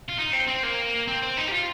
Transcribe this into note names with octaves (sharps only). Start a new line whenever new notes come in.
F4
D#4
C4
C4
A#3
C4
C4
D#4
G4
F4